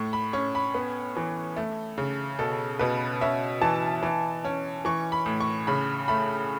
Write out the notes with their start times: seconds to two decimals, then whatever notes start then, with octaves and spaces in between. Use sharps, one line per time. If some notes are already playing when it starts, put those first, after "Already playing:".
Already playing: A2 C#6
0.13 B5
0.33 C#4 C#6
0.55 B5
0.74 B3
1.16 E3
1.56 A3
1.98 C#3
2.39 B2 A4
2.79 B2 B4
3.21 C#4 E5
3.62 E3 A5
4.03 E3
4.45 C#4
4.85 E3 C#6
5.12 B5
5.26 A2
5.40 C#6
5.67 C#3 B5
6.08 A3 B5